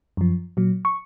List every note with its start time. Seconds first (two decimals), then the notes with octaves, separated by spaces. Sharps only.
0.17 F#2 F3
0.57 A#2 F#3
0.85 C#6